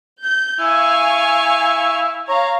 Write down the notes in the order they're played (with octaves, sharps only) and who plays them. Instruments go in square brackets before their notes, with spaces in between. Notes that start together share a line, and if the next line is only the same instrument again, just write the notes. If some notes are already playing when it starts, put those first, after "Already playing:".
[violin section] G6
[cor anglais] E4 [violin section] F5 G#5 C#6
[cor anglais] C#5 [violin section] F5 A#5